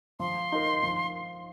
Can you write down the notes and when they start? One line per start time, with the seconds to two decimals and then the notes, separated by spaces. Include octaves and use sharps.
0.20 F3 C6
0.52 D#4 A#4
0.83 F3